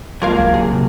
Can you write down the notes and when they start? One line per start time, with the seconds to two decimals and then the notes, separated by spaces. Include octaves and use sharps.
0.22 C#2 F#3 A#3 F4 A#4 F5
0.39 D3 G3
0.54 C3 G#4
0.70 B1 C3